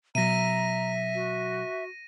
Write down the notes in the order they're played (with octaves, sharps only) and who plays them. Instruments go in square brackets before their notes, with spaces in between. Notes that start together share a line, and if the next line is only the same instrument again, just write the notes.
[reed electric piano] B2 F#3 [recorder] E5 [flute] A#5 [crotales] A#6 D#7
[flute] F#4